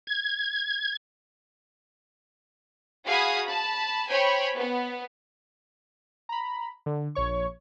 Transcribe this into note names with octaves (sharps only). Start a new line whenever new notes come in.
G#6
F#4 G#4 F5 G#5 B5 D#6
A5 B5
C5 C#5 G5 G#5 B5 C#6
B3
A#5 B5
D3
A#1 C#5 C#6